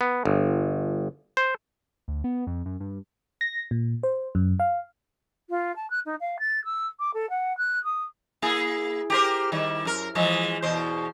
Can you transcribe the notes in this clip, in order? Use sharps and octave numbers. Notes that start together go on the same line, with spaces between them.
B3
G1
C5
D2
B3
F2
F#2
G2
A#6
A#2
C5
F#2
F5
F4
A5
F#6
D#4
F5
A6
E6
D6
A4
F#5
F#6
D#6
A#3 E4 G#4
G4 A#4 C5
D#3 G3 E4
F#2 A#4
E3 F3 G#3
E2 B2 C5